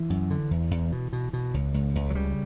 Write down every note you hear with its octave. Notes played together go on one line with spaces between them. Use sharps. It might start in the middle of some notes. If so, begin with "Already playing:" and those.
Already playing: E3
F#2
D3
E2
E2
B2
B2
B2
C#2
C#2
C#2
F#3
C#3 G3